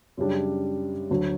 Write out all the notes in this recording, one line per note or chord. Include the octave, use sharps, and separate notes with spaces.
F#2 C#3 G3 D4
D2 D3 F#3